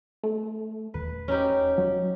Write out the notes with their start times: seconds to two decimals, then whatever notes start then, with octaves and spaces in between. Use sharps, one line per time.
0.23 A3
0.94 E1 B4
1.28 C#4 D#4 G4
1.78 F#3